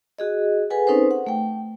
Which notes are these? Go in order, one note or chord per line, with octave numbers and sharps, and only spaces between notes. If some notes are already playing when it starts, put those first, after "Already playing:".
F#4 G#4 D#5
G#4 A4 B4 F#5 G#5
C4 C#4 D#4 A4 B4 C5
F#5
A3 G5